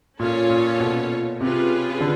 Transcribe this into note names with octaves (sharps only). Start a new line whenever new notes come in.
A#2 C#4 F4 A4 C#5
A#2
B2
C3 C#4 F4 G#4 B4
D3